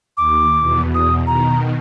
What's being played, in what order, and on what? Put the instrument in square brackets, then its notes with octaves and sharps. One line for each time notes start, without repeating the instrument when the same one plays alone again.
[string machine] D#2 [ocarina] D6
[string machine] E2 B2
[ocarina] D#6
[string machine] B2 D#3 [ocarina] A#5